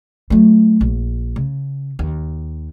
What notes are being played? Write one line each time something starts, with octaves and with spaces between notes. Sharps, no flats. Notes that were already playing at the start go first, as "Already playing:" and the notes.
F#3 A3
A#1
C#3
D#2